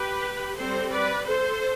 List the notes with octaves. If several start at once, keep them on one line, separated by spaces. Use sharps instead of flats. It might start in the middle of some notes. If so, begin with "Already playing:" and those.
Already playing: G4 B4
G3 C4 A4 C5
B4 D5
A4 C5